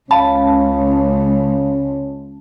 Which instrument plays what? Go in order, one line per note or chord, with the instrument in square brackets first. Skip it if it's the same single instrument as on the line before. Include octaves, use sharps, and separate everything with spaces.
[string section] C#2 [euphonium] C#4 [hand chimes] F5 B5 [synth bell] A5